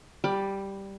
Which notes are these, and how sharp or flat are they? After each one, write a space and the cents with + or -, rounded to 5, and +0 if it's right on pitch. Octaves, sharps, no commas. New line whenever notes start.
G3 +0 B5 +25 D6 +20